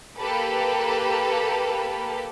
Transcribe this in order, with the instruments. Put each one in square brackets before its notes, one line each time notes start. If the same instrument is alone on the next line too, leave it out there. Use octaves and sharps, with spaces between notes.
[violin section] A#3 G4 A4 B4